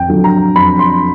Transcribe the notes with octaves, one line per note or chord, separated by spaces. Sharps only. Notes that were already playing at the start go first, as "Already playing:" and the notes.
Already playing: F2 G5
D3 F#3
A#5
F2 B5
C6